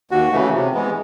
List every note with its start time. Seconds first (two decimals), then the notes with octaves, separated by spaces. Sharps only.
0.11 D#2 F#4
0.32 C#3 E3 A3
0.53 C3
0.74 E3 G#3 B3